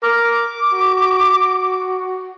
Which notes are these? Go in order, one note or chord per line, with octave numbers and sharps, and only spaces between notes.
A#4 D6
F#4